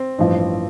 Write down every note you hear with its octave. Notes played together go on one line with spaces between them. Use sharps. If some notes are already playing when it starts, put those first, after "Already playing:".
Already playing: C4
A1 G2 F3